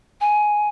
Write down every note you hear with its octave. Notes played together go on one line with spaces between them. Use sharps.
G#5